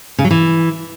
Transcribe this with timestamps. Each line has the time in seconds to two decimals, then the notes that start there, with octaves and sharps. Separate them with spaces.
0.18 C#3
0.24 F#3
0.31 E3